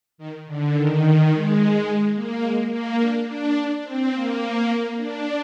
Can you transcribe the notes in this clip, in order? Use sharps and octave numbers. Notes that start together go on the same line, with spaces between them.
D#3
D3
D#3
G#3
A#3
G#3
A#3
D4
D4
C4
A#3
D4